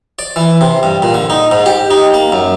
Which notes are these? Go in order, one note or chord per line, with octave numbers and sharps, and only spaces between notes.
D5
E3
C3
G2
A#2
D3
D#4
G#2
G4
D#4
A#3
F#2